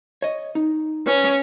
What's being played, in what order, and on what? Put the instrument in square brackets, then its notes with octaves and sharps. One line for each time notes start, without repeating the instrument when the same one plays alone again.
[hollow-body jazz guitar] C#5 D#5
D#4
[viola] C#4 [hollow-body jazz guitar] B4 C#5